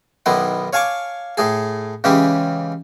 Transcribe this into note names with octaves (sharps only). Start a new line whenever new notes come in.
B1 D#3 B3 E4 C6
C#5 F5 G#5 A5 C#6 D6
A2 A3 G#4
C#3 E3 G#3 C#4 G4